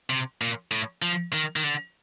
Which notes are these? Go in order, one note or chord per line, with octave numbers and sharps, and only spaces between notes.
C3
A#2
A2
F3
D#3
D#3
D3